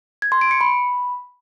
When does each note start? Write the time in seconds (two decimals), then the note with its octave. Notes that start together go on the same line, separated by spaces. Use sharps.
0.22 G#6
0.32 C6
0.41 D7
0.51 C#7
0.61 B5